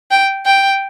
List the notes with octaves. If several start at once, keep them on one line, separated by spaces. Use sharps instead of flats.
G5
G5